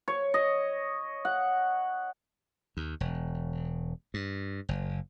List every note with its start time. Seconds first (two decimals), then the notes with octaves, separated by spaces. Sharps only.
0.08 C#5
0.34 D#5
1.25 F#5
2.77 D#2
3.00 E1
4.14 G2
4.69 F#1